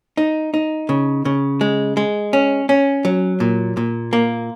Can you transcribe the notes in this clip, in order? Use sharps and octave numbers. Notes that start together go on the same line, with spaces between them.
D#4
D#4
C#3
C#3
G#3
G#3
C#4
C#4
F#3
A#2
A#2
A#3